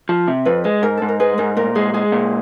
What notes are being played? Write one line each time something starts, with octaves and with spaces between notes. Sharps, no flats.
F3
C3
F2 B4
G#3 B4
G#2 A#4
G#2 A4
A#4
G#3 B4
G#2 A#4
A#2 A#4
G#3 G#4
G#3 G#4
A#2